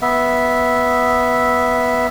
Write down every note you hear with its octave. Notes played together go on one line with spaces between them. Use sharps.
B3 E5